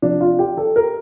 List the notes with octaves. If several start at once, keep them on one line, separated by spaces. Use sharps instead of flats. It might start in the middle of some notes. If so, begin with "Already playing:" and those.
C3 F3 D4
F4
G4
A4
A#4